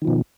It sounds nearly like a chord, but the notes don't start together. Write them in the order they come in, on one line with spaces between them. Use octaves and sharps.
D#3 F3 B2